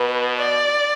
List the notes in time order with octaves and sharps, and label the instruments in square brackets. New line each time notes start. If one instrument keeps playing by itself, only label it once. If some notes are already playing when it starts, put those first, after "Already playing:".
Already playing: [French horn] B2 [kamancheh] B4
[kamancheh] D5